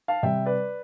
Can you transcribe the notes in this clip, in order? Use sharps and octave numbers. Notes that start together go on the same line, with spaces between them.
F5 A5
C3 G3 E5 G5
B4 D5